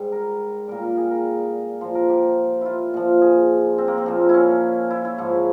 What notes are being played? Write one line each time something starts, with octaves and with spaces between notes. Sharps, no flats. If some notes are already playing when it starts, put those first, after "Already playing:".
Already playing: G#2 G3
A#4
A#2 G3 A#4
A#4
G#4
A#4
A#2 F3 C5
A#4
G4
E4 F4
A#2 F3
G#4
C4
A#3
C4
A#2 F3
E4
C#4
E4
E4
G#2 F3